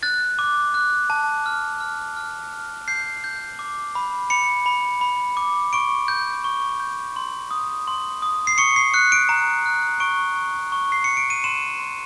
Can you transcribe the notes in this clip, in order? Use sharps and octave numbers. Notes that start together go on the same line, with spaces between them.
F#6 A6
D6
F#6
A5
F6
F6
F6
F6
G6 C7
G6
D6
B5
B5 C#7
B5
B5
D6
C#6 D7
G6
C#6
G6
C6
D#6
C6
D#6
C7
C#6 C#7
C7
F#6 C#7
D7
A#5
F#6
C#6 D7
C#6
C#6
C7
C#6 C#7
D7
D#7
C6 E7
C6